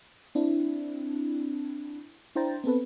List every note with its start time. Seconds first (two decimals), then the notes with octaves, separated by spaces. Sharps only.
0.35 C4 D4 E4
2.36 D4 E4 C5 G5 A#5 A6
2.64 B3 C4 A4 B4